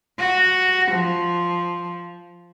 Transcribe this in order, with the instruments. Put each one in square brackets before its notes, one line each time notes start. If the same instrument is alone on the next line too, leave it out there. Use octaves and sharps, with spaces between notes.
[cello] F#4
F3